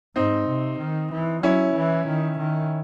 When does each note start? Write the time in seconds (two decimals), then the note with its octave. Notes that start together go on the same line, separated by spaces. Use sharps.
0.16 G#2 C4 D#4
0.48 C3
0.79 D#3
1.12 E3
1.42 F#3 C#4 E4
1.74 E3
2.07 D#3
2.39 D#3